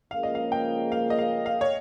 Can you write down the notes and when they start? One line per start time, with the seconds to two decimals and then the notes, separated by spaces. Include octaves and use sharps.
0.11 C#2 C#3 F3 A#3 F5
0.23 D#5
0.35 F5
0.52 G5
0.92 F5
1.10 D#5
1.19 F5
1.46 F5
1.61 C#5